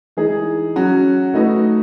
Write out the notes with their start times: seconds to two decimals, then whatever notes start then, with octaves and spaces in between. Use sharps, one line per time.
0.17 E3 G#3 D#4 G#4
0.76 F#3 C#4 F#4
1.34 A3 D#4 F#4 B4